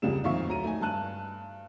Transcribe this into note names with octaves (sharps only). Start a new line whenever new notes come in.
F1 C#2 C#3 G3 E7
F2 A#2 D#3 E5 F5 C#6
D2 F#3 A#5 D#7
A3 D#4 G#5
G2 A5 F#6 D#7